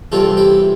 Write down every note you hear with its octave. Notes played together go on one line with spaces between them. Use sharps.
E2 C3 G3 C4 F4 A4
E4 G4